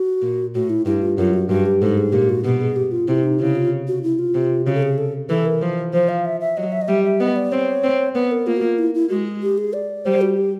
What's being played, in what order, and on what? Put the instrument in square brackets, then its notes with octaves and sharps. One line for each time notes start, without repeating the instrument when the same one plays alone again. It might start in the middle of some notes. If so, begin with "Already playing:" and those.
Already playing: [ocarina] F#4
[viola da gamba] A#2
[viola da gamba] A2 [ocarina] F#4
[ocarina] E4
[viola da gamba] G2 [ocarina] E4
[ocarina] F4
[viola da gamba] F#2 [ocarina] F4
[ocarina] F#4
[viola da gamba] G2 [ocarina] F#4
[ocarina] G4
[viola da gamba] G#2 [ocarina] A4
[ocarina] G#4
[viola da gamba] A#2 [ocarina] G4
[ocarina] F#4
[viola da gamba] B2 [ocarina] G4
[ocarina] G#4
G4
F4
[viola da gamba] C3 [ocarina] E4
[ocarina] D#4
[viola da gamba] C#3 [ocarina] E4
[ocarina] F4
F#4
E4
F4
[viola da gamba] C3
[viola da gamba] C#3 [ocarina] F#4
[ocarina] A4
G#4
A4
[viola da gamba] E3 [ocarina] A4
[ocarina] A#4
[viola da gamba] F3
[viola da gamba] F3 [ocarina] C5
[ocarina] F5
E5
E5
[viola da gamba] F#3 [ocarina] D#5
[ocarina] E5
D#5
[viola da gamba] G3 [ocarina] E5
[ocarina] E5
[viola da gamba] B3 [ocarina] D#5
[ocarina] D5
[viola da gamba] C4 [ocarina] C#5
[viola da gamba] C4
[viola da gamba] B3 [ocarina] B4
[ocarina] A#4
[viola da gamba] A#3 [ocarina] F4
[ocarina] F#4
F4
E4
E4
[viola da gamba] G#3 [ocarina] F#4
[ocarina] G4
G#4
D5
[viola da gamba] G3 [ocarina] C5
[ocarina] F#4
G4